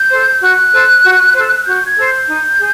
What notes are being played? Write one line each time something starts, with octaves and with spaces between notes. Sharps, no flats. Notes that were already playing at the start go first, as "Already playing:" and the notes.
Already playing: G6
A4 C5
F#4 F#6
A4 C5
F#4
A4 C5
F#4 G6
G#6
A4 C5
G6
D#4
G#4